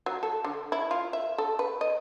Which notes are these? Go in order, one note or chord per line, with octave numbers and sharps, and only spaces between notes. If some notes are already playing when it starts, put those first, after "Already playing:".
F#3
A4
D3
E4
F4
E5
A4
B4
D#5